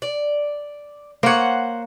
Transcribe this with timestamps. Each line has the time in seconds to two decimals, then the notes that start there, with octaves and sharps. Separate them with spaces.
0.02 D5
1.23 A#3 C5 C#5 F#5